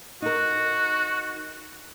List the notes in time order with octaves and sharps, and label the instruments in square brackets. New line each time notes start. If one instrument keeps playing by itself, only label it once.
[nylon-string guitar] D#4 A#4 [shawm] F#4